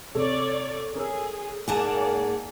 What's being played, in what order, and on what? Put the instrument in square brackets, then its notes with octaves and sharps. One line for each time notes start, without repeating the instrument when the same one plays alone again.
[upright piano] C3 [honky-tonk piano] A4 [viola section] C#5 D5
[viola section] G#4 [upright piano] A#4 C#5 E6
[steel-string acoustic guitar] G#2 G#4 F#5 [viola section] A#3 D5 [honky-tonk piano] G#5 A5 E7